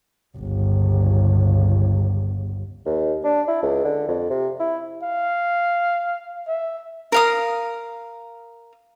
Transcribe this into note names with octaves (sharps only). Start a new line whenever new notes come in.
G1 C#2
D#2
D4
E4
C#2
D3
F2
C3
E4
F5
E5
A#4 F5 D#6